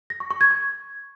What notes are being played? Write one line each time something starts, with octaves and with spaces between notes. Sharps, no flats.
A#6
C#6
C#6
G#6
C#6